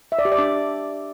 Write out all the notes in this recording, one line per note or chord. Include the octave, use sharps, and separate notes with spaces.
E5
D5
G4
D5
D4